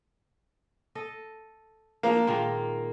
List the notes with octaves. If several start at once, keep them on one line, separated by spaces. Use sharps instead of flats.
A4 D#5
F3 A#3 D4 D#4
A#2 D#3 G#3